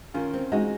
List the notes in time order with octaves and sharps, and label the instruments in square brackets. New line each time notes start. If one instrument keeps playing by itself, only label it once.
[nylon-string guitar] D#3 [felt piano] C#4 F4
[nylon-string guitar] C4
[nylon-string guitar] G#3 [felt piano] D#4 F#4